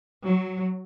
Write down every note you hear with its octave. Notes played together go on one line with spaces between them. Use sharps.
F#3